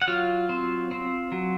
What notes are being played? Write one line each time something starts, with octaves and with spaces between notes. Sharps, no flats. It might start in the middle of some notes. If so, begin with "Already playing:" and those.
F#5
F#3 F4 F5
C4
C4
F#3